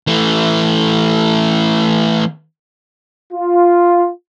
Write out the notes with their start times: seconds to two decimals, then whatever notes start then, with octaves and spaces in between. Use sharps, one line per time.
0.07 E3 A3
3.33 F4